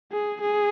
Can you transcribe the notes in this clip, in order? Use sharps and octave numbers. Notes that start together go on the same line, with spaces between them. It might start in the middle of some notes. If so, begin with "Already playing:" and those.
G#4
G#4